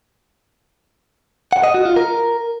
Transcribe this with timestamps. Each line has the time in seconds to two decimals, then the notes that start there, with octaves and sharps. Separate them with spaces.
1.53 F#5
1.63 D#5
1.74 F#4
1.85 F4
1.96 A#4